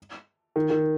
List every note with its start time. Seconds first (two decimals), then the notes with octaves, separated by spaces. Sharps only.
0.56 D#3
0.70 D#3